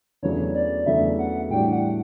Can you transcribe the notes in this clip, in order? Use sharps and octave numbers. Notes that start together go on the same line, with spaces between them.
E2 C#3 F#3 A3 D4 C#5
D5
E2 C#3 F#3 A3 D4 E5
F#5
A2 E3 G3 D4 F#4 G5
F#5